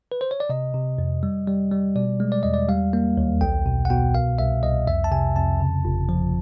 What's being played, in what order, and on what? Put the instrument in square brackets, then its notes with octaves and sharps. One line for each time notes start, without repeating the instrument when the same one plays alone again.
[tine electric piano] B4
C5
C#5
D5
C3 D#5
C3
F2
G3
G3
G3
B2 D5
G#3
D5
E2 D#5
D5
G3 F5
A#3
D#2
B1 G5
B2
F#5
B2 G5
C2 F5
C2 E5
C2 D#5
F2 E5
A5
C3 G#5
F2 A5
C#3
G1
F3